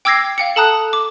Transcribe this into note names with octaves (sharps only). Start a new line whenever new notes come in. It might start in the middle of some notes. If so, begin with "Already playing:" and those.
G5 D6 E6 G#6 A#6 C7
F5 G5 C#7
A4 A5 A#5 D#6 F#6
D6